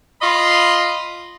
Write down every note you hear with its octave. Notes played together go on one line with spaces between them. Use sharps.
F4 D#5 B5 C6